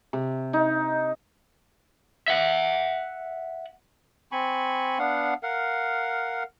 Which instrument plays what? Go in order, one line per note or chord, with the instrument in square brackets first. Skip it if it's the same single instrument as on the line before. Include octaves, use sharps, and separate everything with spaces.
[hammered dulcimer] C3
D#4
[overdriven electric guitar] E5 F#5
[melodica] C4 G#5 B5 C#6
B3 D4 F5 F#5
A#4 F5 F#5